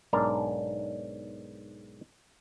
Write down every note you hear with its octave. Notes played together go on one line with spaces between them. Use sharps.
B1 G#2 D4 A#4 A#5